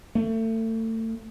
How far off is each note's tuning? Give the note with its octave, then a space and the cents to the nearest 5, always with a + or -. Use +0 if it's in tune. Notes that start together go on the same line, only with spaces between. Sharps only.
A3 +30